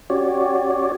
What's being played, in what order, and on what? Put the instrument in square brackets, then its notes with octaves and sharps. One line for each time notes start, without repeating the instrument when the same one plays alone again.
[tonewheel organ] C#4 F#4 G4 C#5 D5